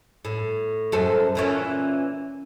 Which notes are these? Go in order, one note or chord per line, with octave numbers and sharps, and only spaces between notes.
A2
F#2 A4 C5
A#2 E3 C#4